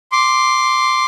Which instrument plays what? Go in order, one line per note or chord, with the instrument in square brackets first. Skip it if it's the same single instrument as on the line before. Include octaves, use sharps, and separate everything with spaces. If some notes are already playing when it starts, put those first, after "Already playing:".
[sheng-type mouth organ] C6 D6